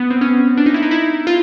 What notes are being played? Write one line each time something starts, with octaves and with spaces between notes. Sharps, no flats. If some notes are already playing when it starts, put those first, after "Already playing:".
Already playing: B3
C4
C#4
D4
D#4
E4
D#4
E4
F4